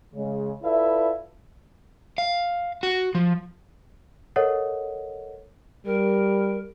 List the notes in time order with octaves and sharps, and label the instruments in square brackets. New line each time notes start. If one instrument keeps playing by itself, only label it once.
[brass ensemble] C#3 G#3
E4 F4 A4 B4 D5 E5
[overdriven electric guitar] F5
F#4
F3
[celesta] A4 A#4 C#5 D#5 F#5
[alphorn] G3 [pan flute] A#4